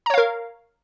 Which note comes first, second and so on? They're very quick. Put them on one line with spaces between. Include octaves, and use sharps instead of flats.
A#5 C#5 F5 A#4